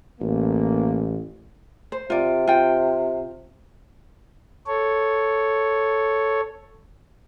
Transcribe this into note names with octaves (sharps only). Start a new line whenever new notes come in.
A1 A#3
C5
C3 F4 D5
F4 G5
A4 C#5